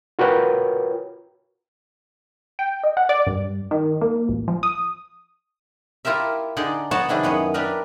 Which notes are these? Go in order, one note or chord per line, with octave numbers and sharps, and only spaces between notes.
F4 F#4 A#4 B4 C#5 G5
G5
D#5
F#5
D5
G2
D#3
A#3
A1
F3
D#6
E4 F4 G4 A#4 E5
D3 D#4 G#4 D5
B3 F#4 C#5 F#5 A5
C3 D#3 D4 E4 G#4
F#2 B3 G#4 C#5
D4 G4 A#4 B4